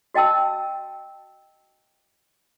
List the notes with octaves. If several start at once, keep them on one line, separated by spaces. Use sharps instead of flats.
F#4 D#5 G5 A5 E6